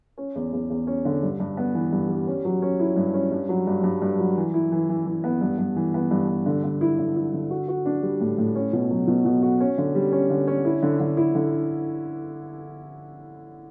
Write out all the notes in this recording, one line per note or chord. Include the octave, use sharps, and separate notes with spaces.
C#4
E2
E2
E2
C#4
D3
G2
G2
B3
E3
G2
G3
C#4
F#3
C#4
E4
G2
C#4
G2
F#3
G2
G2
G2
F#3
E3
E4
E3
E3
E3
B3
G2
G2
E3
B3
G2
G2
D3
D3
E4
D3
E4
D3
F#4
F#4
D4
G3
A2
A2
C#4
B2
F#3
B2
B2
F#4
C#4
D3
G3
C#4
D3
C#4
E4
D3
D3
E4
D3